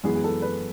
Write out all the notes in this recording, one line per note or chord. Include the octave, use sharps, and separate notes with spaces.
F#2 E3 G#3 B3 G#4
G#4
A4
B4